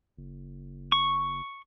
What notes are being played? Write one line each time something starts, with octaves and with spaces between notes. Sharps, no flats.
F#1
C#6